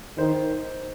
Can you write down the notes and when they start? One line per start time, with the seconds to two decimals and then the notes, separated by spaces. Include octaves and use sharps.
0.18 D#3 C5